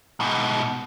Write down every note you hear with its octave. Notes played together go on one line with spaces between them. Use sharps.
G#2 B2